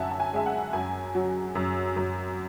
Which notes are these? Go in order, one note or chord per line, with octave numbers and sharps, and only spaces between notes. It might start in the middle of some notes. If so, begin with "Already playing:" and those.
Already playing: F#2 E5 F#5 G#5 A5
A5
G#5
G#3 E5
F#5
F#2 G#5
F#3
F#2
F#2